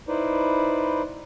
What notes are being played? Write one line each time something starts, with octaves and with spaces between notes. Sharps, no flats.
D#4 E4 B4 C5 D5